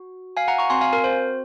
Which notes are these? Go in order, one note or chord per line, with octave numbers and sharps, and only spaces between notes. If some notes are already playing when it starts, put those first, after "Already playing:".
Already playing: F#4
F5 G#5
F#5 A#5
A#5 C#6
C4 F#4 G#5 C6
F5 G#5
A#4
C5